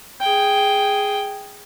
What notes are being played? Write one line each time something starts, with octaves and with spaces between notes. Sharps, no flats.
G#4 G5